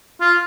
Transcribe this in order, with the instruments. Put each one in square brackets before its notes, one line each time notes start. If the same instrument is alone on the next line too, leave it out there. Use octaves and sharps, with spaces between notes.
[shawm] F4